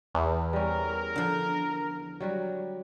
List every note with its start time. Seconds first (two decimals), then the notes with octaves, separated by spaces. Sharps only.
0.15 E2
0.53 G3 C#4 A#4
1.16 D3 F3
2.20 F#3 G3 F#4